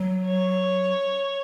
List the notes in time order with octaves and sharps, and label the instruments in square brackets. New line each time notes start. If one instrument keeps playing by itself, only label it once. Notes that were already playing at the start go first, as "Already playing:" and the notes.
Already playing: [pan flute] F#3
[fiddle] C#5